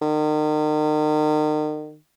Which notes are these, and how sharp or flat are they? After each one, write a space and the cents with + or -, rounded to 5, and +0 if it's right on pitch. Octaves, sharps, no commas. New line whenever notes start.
D#3 -35